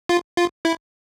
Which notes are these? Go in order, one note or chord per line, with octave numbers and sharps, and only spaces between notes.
F4
F4
E4